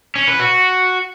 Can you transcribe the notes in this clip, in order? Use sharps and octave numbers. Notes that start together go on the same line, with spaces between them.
C#4
B4
F#4